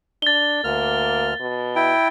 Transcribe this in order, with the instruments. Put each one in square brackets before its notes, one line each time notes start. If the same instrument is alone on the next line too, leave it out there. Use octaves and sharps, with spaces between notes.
[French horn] D4 [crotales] A6 G7
[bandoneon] D2 F6 [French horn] A#3
[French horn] B2
[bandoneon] E4 G5